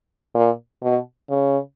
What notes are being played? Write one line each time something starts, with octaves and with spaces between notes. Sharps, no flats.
A#2
B2
C#3